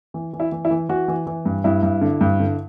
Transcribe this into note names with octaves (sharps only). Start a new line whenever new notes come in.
E3
E3
E4
E3
E4
E3
E3 F#4
E3
E3
G2
G2 E4
G2
D3
G2
D3